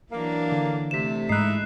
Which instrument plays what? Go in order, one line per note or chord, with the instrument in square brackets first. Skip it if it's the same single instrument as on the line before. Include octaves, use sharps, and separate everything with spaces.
[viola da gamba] E3 F#3 D4 [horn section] A#3
[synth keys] D3
[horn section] C3 [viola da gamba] A3 [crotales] B6 E7
[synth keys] G#2 G#3 [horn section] D#4 E4 [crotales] F#6 C7